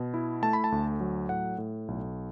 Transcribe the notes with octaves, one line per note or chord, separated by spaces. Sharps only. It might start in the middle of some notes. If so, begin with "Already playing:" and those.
Already playing: B2
E4
A3 A5
B5
A5
D2
F#3
A2 F#5
A2
B1